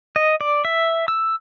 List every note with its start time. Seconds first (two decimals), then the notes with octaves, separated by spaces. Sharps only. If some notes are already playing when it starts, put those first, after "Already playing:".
0.16 D#5
0.41 D5
0.65 E5
1.08 E6